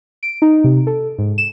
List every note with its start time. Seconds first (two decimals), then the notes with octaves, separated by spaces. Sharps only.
0.23 D7
0.42 D#4
0.64 C3
0.87 A4
1.18 G#2
1.38 E7